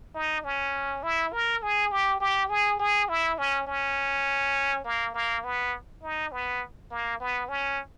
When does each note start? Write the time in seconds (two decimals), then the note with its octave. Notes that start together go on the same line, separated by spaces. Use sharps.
0.15 D#4
0.44 C#4
1.03 E4
1.32 A#4
1.62 G#4
1.92 G4
2.20 G4
2.50 G#4
2.79 G#4
3.09 E4
3.38 C#4
3.67 C#4
4.85 A#3
5.14 A#3
5.44 B3
6.03 D#4
6.32 B3
6.91 A#3
7.20 B3
7.49 C#4